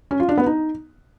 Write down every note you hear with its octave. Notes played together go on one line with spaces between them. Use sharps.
C#4
F4
D4
B3
D#4